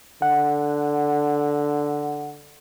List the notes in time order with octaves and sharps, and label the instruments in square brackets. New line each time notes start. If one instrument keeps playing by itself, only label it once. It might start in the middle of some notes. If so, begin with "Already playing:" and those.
[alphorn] D3 [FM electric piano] F#5